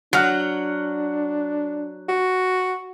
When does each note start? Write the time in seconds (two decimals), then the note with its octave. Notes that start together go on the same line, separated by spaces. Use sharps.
0.13 F#3 D4 F#5 F6
2.09 F#4